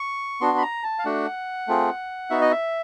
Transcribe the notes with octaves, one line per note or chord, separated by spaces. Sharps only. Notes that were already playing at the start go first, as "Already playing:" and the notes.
Already playing: C#6
B3 D4 F#4 C6
B5
A#5
A5
F5
A3 D4 F#4 F#5
A3 C4 F4 G#4
B3 D#4 F#4 E5
D#5
E5